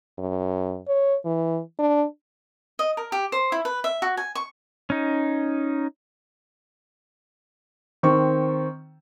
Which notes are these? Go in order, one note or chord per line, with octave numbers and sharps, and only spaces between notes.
F#2
C#5
E3
D4
D#5
A#4
G4
C5
E4
B4
E5
F#4
G#5
C#6
C#4 D#4
D#3 C4 C#6